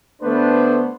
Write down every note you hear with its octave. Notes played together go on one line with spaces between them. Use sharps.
D3 A3 B3 D4 B4 C5